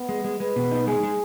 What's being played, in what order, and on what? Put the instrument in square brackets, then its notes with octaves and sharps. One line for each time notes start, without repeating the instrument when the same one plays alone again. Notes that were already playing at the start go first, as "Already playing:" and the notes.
Already playing: [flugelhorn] B3
[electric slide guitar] G#3
G#3
[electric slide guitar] G#3 [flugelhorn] B4
[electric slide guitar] B2
D#4
[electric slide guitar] G#3 [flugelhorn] G#4
[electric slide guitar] G#3